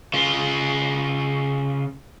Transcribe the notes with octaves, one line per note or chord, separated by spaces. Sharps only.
C#3 F4